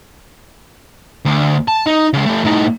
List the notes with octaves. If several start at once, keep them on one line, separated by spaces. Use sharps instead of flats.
D2
A5
D#4
C#3 G#3
A3 G4
A2 D#4